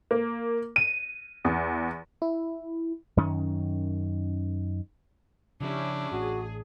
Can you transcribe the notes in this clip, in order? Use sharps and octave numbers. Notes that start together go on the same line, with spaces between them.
A#3
D#7
E2
E4
F#2 D#3 C#4
C#3 F3 C#4 D4 E4 G4
A1 A2 F#4 G#4